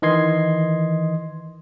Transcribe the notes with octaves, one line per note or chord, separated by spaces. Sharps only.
D#3 E3 D#5 C6 G#6 C7